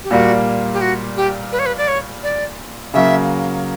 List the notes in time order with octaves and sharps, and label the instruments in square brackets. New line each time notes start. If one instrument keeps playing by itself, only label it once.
[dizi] G4
[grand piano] A#2 G3 A#3 [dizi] F#4
[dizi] G4
F#4
G4
B4
C#5
B4
D5
C#5
D5
[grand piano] C#3 F#3 A#3 [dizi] E5